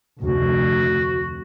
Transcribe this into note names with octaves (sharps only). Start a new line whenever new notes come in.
F1 D2 F#4